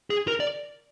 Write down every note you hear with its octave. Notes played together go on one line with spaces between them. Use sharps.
G#4
A#4
D5